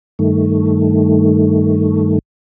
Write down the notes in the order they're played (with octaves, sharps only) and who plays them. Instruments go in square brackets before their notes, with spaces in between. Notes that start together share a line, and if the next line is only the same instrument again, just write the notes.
[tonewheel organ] G2 D#3 A3